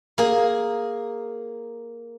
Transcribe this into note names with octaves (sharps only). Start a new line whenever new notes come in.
A#3 G#4